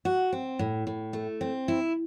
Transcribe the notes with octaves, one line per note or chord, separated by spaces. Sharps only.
F#4
C4
A2
A2
A3
C4
E4